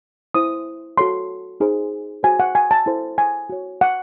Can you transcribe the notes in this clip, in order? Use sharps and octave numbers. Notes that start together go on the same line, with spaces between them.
E4 C5 D#6
F#4 A4 C#5 C6
D#4 G#4 C5
F#4 C5 G#5
F#5
G#5
A5
E4 A4 C5
G#5
F#4 C#5
F#5